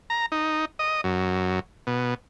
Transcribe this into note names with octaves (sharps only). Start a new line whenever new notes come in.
A#5
D#4
D#5
F#2
B2